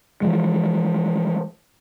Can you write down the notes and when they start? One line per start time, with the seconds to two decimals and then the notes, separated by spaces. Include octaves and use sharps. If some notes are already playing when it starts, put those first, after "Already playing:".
0.22 E3 F3 G#3